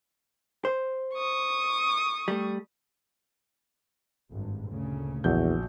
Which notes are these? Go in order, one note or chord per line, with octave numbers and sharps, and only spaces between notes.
C5
C#6 D#6
G3 A3
G#1 G2
D2 A#2 C#3
A#1 E2 F#4 G6